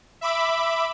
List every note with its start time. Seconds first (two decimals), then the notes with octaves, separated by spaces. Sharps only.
0.21 E5 B5 D6